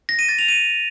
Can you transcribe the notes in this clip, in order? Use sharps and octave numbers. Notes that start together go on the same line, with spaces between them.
A#6
D#7
A6
F7
D#7